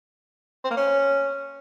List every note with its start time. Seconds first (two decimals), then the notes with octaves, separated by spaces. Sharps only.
0.64 C4
0.70 A#3
0.77 C#4